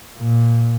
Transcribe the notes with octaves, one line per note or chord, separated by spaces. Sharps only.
A#2